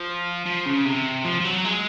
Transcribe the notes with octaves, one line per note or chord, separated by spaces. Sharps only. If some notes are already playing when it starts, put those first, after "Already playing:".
Already playing: F3
F3
C#3
C3
F3
F3
F#3
G#3